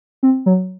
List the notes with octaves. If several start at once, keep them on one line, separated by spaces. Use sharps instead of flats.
C4
F#3